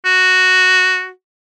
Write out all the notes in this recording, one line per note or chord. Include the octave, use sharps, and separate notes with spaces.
F#4